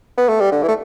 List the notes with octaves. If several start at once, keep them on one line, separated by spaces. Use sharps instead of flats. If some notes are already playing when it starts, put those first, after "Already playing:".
B3
A3
G3
D3
E3
A3